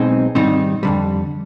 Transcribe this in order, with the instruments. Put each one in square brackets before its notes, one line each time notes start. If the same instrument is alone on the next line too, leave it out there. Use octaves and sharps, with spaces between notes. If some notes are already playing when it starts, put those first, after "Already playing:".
Already playing: [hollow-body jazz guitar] B1 B2 G#3 C4 D#4
G#2 D#3 G3 C4 D#4
F2 D3 G3